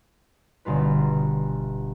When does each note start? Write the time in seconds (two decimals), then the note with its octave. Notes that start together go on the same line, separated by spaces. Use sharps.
0.65 G1 B2 F4 B4